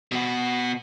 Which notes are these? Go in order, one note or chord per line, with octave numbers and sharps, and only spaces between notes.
B2 F#4